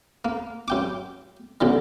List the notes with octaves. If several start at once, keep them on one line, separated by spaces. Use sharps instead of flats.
A#3
F#2 G5 D6
F#2 B2 D3 D#3